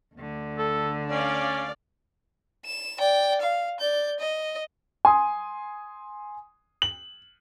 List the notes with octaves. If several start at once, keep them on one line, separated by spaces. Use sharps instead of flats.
D2 D3
A4
C#4 D5 F5
E7
D5 G5
F5
D5 G6
D#5
G#5 C6 D#6
F#7